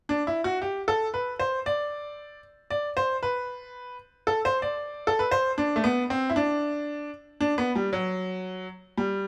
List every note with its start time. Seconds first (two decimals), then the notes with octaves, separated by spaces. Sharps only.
0.09 D4
0.27 E4
0.44 F#4
0.62 G4
0.88 A4
1.14 B4
1.39 C5
1.66 D5
2.70 D5
2.97 C5
3.23 B4
4.27 A4
4.45 C5
4.62 D5
5.07 A4
5.19 B4
5.31 C5
5.58 D4
5.76 A3
5.84 B3
6.10 C4
6.30 E4
6.36 D4
7.41 D4
7.58 B3
7.75 G3
7.93 F#3
8.97 G3